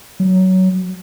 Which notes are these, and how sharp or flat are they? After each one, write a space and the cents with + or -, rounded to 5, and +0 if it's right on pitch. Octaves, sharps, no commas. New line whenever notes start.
F#3 +15